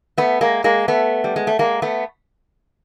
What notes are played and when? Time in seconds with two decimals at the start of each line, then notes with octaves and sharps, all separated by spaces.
0.18 A3 B3
0.41 G#3 A#3
0.64 G#3 A#3
0.88 A3 B3
1.24 G3
1.36 G#3
1.47 A3
1.59 G#3 A#3
1.82 A3 B3